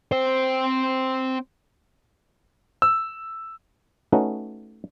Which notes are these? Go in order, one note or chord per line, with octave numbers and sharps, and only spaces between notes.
C4 C5
E6
A3 C#4 D#4 F#4 B4